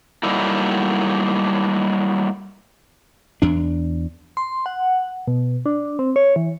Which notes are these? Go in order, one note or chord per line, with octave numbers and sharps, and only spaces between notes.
F#3 G3 A3 A#3 D#4 E4
E2 D4
C6
F#5
B2
D4
C4
C#5
E3